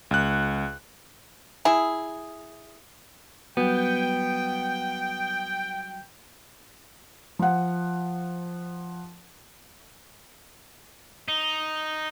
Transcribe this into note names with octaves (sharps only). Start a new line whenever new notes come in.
C#2 F#6
E4 G#4
F#3 G3 B3 F#4 G5
F3 F#5
D#4